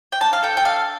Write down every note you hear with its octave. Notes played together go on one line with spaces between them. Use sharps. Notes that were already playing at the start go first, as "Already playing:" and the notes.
G5
D4 A5
F5
A4 G5
G5
D4 F5